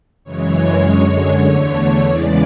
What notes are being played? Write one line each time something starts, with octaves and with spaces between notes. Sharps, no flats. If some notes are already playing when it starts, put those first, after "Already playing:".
F#2 C#3 E3 G#3 C#5
F#2 D3 G#3
E2 D3 A3
E2 C#3 E3 G#3 D5